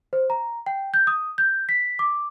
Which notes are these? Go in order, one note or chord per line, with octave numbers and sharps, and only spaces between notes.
C5
A#5
G5
G6
D#6
G6
B6
D6